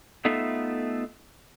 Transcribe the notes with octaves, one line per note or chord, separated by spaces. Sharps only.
A3 B3 D#4 F4 A4 E5